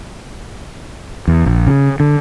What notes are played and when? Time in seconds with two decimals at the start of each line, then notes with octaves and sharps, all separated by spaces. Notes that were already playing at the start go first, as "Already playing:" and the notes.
1.28 E2
1.46 A#1
1.67 C#3
2.00 D3